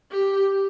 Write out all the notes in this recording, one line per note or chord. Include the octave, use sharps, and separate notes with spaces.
G4